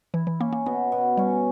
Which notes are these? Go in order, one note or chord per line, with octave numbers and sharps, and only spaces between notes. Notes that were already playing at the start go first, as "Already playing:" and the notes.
E3 E4
E3
A#3 C#4
A#3
B2 B3
B2
G3 C#4